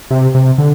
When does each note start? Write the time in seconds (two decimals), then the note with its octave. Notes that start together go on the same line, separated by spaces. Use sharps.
0.11 C3
0.35 C3
0.58 D3